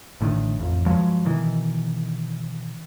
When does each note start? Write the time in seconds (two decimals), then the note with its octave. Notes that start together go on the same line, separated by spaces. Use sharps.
0.21 A1 A2 D3 D#3
0.59 A1 F2
0.86 G2 F3 F#3 G#3
1.25 B2 D#3 E3